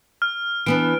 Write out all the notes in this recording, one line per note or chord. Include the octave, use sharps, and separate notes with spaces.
F6
E3 B3 D4 D7